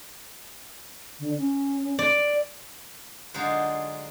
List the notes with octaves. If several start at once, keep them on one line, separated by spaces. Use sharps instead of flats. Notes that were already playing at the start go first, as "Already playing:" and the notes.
D3
C#4
D5
D3 F#3 G#3 D#4 F4 C5